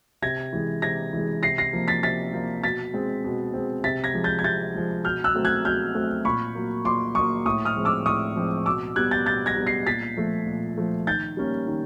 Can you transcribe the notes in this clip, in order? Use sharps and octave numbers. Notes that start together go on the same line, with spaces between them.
C3 G#6 A#6
E3 G#3
C3 G#6 A#6
E3 G#3
C3 A#6 C7
A#6 C7
F3 A#3
A6 B6
C3 A6 B6
F3 A#3
B2 A6 B6
G#3 C4
B2
G#3 C4
C3 A6 B6
G#6 A#6
F3 G#3
G6 A6
G#6
C3 G6 A6
F3 G#3
B2 F6 G6
E6 F#6
F#3 A3 C4
F#6 G#6
B2 F6 G6
F#3 A3 C4
A#2 B5 C#6
F#3 A#3
A#2 C6 D6
F#3 A#3 C#6 D#6
A2 C#6 D#6
D#6 F6
F3 G#3 C4
D6 E6
A2 C#6 D#6
F3 G#3 C4
B2 D6 E6
G3 B3 F#6 G#6
G6 A6
B2 G6 A6
G#6 A#6
G3 B3
A#6 C7
A#2 A6 B6
F3 A3
A#2
F3 A3
D#3 G6 A6
G3 A#3 C#4
D#3